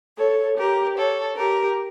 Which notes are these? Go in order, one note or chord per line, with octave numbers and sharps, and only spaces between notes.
A4 C#5
G4 A#4
A4 C#5
G4 A#4